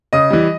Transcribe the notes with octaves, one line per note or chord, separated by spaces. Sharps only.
C#3 D#5 D#6
E3 G3